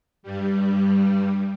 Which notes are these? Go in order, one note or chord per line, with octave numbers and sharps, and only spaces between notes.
G2 G3